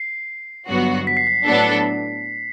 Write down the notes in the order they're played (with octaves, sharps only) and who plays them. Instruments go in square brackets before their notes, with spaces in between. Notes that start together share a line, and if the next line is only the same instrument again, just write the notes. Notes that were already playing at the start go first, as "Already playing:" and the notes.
Already playing: [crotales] C7
[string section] G1 G2 F#3 B3 F#4
[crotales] B6
C7
B6
[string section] A2 F#3 B3 D4 A4